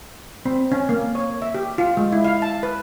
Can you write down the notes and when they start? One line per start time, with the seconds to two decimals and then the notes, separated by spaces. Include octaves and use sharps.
0.46 C4
0.72 C#4
0.89 A#3
1.15 C#5
1.42 E5
1.55 G4
1.78 F4
1.97 G#3
2.12 E4
2.24 F5
2.42 A5
2.63 B4